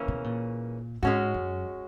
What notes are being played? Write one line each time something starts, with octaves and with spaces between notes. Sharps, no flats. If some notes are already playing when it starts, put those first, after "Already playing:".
Already playing: C#3 E3 A#3 C#4
B2
A#2
G#2 G#3 C#4 F#4
F#2